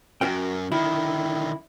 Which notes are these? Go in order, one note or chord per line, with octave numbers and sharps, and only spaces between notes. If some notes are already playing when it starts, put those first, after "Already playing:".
F#2 F#4 A#4 G5
D3 D#3 E4